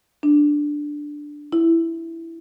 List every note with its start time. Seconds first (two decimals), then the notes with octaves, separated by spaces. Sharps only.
0.23 D4
1.52 E4